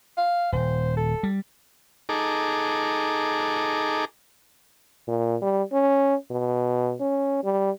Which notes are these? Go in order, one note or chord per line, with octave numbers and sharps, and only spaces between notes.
F5
D#1 C5
A4
G3
D#4 G#4 A4 A#5 D6
A#2
G3
C#4
B2
C#4
G3